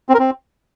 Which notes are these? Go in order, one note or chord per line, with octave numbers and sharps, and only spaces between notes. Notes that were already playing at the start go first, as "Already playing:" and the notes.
C4
A#4
C4